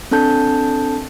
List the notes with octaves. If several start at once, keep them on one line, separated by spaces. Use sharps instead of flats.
C4 D4 A4 A5 G6